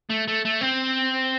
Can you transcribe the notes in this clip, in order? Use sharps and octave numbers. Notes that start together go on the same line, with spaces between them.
A3
A3
A3
C4